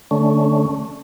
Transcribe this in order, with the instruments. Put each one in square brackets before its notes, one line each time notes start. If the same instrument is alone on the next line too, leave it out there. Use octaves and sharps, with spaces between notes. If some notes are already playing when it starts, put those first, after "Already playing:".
[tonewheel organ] D3 A3 C#4